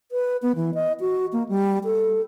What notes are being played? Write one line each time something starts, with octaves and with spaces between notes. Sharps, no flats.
B4
B3
E3
D#5
F#4
A#3
G3
A4